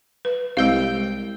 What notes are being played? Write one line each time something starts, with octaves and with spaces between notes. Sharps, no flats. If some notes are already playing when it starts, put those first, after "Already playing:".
B4
C2 G#3 F5 G5